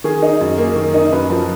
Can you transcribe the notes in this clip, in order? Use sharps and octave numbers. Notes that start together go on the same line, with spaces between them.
D#3 G#4
D#4
F#2
A#3
D#3
D#4
F#2 B4
F3